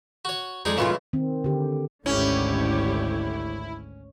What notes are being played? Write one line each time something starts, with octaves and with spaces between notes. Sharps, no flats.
F#4 C#5
F2 G#3 D#4 G#4 D5
D#2 A#2 C#3 E3 G#3 F4
D#3 C4
D3 G4
G#1 D2 D3 C#4 E4 G4 C#5